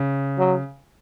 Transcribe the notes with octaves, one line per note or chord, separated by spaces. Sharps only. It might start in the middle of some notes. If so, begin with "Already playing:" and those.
Already playing: C#3
F#3